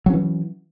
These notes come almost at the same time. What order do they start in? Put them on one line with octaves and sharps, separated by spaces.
F#3 C#4 E3